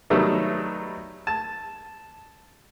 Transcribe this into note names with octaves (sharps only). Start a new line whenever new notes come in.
D#3 F#3 G3 A3 B3 D#4
A5